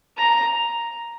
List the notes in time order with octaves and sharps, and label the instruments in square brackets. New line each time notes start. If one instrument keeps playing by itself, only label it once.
[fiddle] A#5